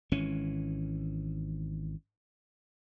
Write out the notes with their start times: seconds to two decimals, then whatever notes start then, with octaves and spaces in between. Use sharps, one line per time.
0.12 G#1 E3 C#4